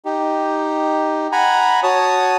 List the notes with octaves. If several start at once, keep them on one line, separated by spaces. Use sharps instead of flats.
D#4 G4
F#5 G#5 A#5 B5
F#4 C#5 A5 D#6